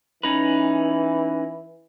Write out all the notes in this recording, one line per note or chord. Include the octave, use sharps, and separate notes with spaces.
E3 C#4 D#4 B4